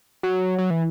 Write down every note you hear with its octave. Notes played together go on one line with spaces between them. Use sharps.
F#3
F#3
E3